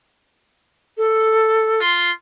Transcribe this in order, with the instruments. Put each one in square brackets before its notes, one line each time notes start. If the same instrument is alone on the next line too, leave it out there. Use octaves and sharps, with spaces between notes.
[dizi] A4
[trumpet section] F4 C6